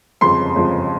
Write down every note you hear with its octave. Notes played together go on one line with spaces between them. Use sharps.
G1 F2 C#3 F3 G#3 C6
G1 F2 C#3 F3 G#3